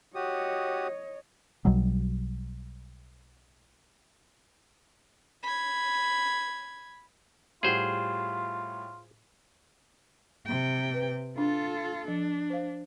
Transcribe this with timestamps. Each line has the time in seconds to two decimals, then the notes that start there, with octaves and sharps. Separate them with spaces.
0.15 F#4 G4 C#5 D#5 D#6
1.65 B1 B2 F#3 G3
5.43 B5 G#6
7.63 A2 G3 F4 G#4 C5 F#5
10.46 C3 G5
10.94 B4
11.38 D4 F4 A4
12.08 F3 D4
12.50 C5 F5